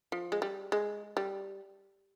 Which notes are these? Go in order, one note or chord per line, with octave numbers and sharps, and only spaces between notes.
F3
G#3
G3
G#3
G3